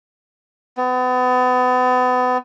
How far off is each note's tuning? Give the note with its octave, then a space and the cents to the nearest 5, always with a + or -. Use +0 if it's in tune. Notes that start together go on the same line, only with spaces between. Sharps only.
B3 +35